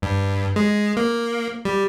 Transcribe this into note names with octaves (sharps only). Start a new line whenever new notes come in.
G2
G#3
A#3
G3